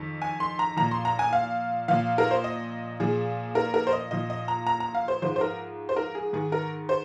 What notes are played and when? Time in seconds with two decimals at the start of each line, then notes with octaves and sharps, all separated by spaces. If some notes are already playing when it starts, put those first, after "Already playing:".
Already playing: F2 D#3
0.22 G#5
0.40 C6
0.59 A#5
0.77 A#2 F3 A#5
0.91 C6
1.05 A#5
1.19 G#5
1.33 F5
1.88 A#2 F3 F5
2.18 A#4
2.31 C5
2.44 D#5
3.00 A#2 F3 G#4
3.55 A#4
3.74 A#4
3.87 C5
3.93 D#5
4.11 A#2 F3 D#5
4.30 D#5
4.48 A#5
4.67 A#5
4.80 A#5
4.95 F5
5.08 C5
5.22 G#2 F3 C5
5.36 C5
5.41 A#4
5.89 C5
5.96 A#4
6.15 G#4
6.33 G#2 D#3 G#4
6.52 A#4
6.89 C5